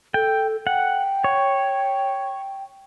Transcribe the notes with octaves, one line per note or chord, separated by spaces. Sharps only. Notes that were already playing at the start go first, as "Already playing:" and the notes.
A4 G5
F#5 G5
C#5